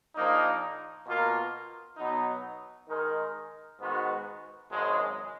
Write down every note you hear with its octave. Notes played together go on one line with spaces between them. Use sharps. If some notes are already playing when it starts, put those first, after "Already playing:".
A#1 A#2 F3 A#3 D#4
B2 A#3 F4 A#4
B2 F#3 B3 D#4
D#3 G#3 D#4 A#4
G#2 D#3 G#3 B3 F#4
G#1 F#2 C#3 G#3